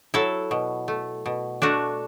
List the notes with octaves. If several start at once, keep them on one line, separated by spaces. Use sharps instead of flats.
F#3 E4 A4
B2
A3
B2
A3 D4 F#4